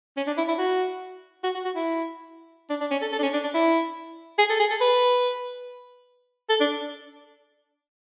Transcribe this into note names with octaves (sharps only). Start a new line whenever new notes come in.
C#4
D4
E4
E4
F#4
F#4
F#4
F#4
E4
D4
D4
C#4
A4
A4
D4
C#4
D4
D4
E4
G#4
A4
G#4
A4
B4
A4
D4